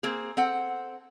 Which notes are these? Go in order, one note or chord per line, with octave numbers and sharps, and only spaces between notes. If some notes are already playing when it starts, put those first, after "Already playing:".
A#3 C4 G#4
C4 A4 F#5